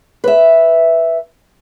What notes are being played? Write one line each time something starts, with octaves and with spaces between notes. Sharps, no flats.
B4 E5